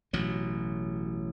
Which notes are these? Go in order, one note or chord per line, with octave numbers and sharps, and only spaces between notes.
A1 B2 F#3